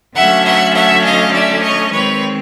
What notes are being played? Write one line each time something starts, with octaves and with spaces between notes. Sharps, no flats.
D3 F#3 A3 C#4 E5 F#5
E5 F#5
E5 F#5
D#5 F5
D5 E5
C#5 D#5
D#3 G#3 C4 B4 C#5